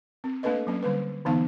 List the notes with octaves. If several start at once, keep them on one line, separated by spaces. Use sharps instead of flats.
C4
A3 A#3 D4 A4 B4 D#5
F#3 A#3 C#4
D3 G3 B4
D3 E3 B3 D#4 F5